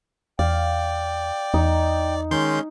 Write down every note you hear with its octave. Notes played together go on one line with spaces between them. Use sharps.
E2 D5 F5 G5
E2 D#4
D#3 G#3 C#4 C6 G6